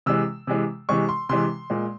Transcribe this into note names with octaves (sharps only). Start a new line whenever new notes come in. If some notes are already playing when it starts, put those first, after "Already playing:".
C3 E3 G#3 E6
C3 E3 G#3
C3 E3 G#3 C#6
C6
C3 E3 G#3 C6
A#2 G#3